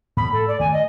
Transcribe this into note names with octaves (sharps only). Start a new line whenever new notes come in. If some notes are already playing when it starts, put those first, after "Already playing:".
A2 B5
A4
D5
D#3 A3 G#5
D#5